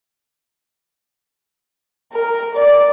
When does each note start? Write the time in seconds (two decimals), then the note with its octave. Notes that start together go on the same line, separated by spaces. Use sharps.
2.13 A#4
2.55 D5